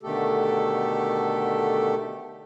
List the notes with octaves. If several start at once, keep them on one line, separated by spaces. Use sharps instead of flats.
B2 D3 D#3 A3 G4 A4